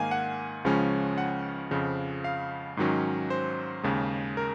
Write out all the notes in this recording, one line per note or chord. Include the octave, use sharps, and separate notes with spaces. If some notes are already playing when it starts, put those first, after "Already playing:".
Already playing: G#2 D#3 A#3 F5 G#5
F#5
C#2 C#3 F3 G#3 C#4
F#5
F2 C#3 F3
F5
G#2 D#3 F#3 C#4
C5
D#2 C#3 G#3
A#4